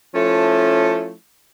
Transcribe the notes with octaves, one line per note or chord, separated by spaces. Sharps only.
F3 A3 C#4 E4